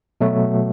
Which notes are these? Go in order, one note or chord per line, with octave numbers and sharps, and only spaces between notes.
B2 F#3 A3